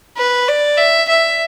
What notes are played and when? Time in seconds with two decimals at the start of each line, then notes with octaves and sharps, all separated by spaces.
0.17 B4
0.48 D5
0.78 E5
1.09 E5